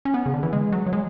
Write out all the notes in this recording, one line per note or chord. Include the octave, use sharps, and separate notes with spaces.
C#4
B3
C#3
D3
E3
G#3
F#3
F#3
G#3